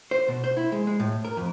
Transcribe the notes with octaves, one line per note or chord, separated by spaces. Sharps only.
C5
B2
C5
E4
G#3
G#3
A2
A#4
F2